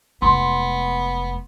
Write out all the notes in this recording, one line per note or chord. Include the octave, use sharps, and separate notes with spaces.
F1 G#3 B3 C6